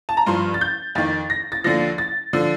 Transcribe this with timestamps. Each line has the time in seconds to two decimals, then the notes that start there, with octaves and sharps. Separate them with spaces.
0.09 A5
0.17 A#5
0.26 G2 F3 C6
0.54 A6
0.61 G6
0.95 F2 D#3 A6
1.30 A#6
1.52 A6
1.64 D#2 D3 F3 A#6
1.98 A6
2.33 D3 F3